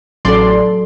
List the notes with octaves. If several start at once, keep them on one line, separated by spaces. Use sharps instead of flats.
A1 F#3 A4 D5 C6